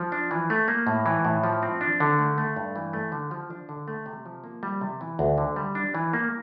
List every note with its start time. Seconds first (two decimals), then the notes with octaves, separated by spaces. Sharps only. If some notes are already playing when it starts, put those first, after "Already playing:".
Already playing: F3
0.12 D4
0.31 E3
0.50 A3
0.68 A#3
0.87 A2
1.06 E3
1.25 A2
1.43 F3
1.63 C4
1.81 D4
2.00 D3
2.19 A3
2.38 A3
2.56 G2
2.76 E3
2.93 A3
3.12 D3
3.31 F3
3.50 D4
3.69 D3
3.88 A3
4.06 C3
4.25 F3
4.44 A#3
4.63 G3
4.81 C3
5.01 E3
5.19 D2
5.38 D3
5.56 G3
5.75 D4
5.95 E3
6.13 A#3